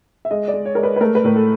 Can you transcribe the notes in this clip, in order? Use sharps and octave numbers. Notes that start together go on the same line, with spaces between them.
E5
G#3 D#5
D5
G#3
C#5
G#3 A#4
B4
B4
A3 A#4
B4
A2 A#4
A4